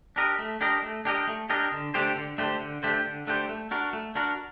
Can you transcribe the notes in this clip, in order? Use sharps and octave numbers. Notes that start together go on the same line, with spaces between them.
D4 G4 A#4 D#5
A3
D4 G4 A#4 D#5
A3
D4 G4 A#4 D#5
A3
D4 G4 A#4 D#5
D3
A3 D4 G4 C5
D3
A3 D4 G4 C5
D3
A3 D4 G4 C5
D3
A3 D4 G4 C5
A3
D4 F#4 A#4
A3
D4 F#4 A#4